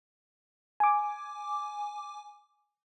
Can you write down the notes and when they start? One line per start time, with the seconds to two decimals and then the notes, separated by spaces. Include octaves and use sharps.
0.80 G#5 D6